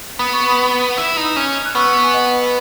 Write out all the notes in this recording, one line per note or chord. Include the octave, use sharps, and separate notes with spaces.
B3 D#6
C#6
B5 D#6
E4
D#4
C#4
F#6
B3 C#6 E6
G#5
D#5 F#5